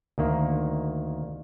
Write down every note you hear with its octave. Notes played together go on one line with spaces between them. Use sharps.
D2 D#3 A#3